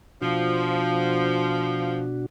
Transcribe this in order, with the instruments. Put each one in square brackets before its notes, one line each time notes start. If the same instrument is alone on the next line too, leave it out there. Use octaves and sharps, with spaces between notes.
[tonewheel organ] B2 D4 F#4 [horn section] F3